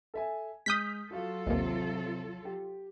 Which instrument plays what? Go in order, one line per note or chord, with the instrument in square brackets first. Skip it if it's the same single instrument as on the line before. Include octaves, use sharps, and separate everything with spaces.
[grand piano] A4 E5 G#5
[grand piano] G#3 F6 [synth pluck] D#6 G6 B6
[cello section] F#3 F4 A4 [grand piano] F#4 F5
[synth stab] A1 D#2 [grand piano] C3 C5
[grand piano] G4